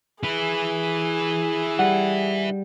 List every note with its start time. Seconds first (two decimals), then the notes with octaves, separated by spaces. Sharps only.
0.23 E4 G#4 B4
1.79 G3 F#5